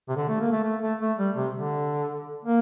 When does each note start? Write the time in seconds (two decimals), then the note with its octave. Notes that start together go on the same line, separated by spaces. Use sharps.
0.09 C3
0.16 D3
0.29 A3
0.41 A#3
0.52 A3
0.64 A3
0.82 A3
1.01 A3
1.19 G3
1.36 C3
1.54 D3
2.44 A#3